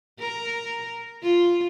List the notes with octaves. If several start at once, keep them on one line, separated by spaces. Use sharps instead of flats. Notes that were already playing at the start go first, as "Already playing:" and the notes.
A#4
F4